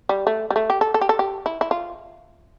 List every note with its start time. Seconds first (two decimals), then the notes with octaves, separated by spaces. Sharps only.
0.09 G3
0.27 A3
0.50 G3
0.56 A3
0.70 G4
0.81 A4
0.94 A4
1.01 G4
1.09 A4
1.19 G4
1.46 E4
1.61 E4
1.71 F4